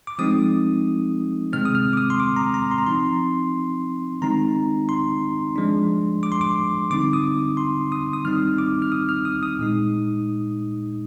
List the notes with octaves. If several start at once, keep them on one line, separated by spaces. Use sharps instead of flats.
D6
F3 G#3 C4 D#4 D#6
C3 D#3 G#3 C4 F6
D#6
F6
D6
D#6
C6
D6
A#5
A#5
C6
A#5
F3 C4 D#4 C6
D#3 G#3 C4 D#4 A#5
C6
F3 G#3 D4
D6
C6
D6
D3 G3 C4 D#4 D6
D#6
C6
D#6
D#6
D#3 G3 C4 D#4 F6
D6
F6
D#6
F6
D#6
D#6
A#2 G#3 D#4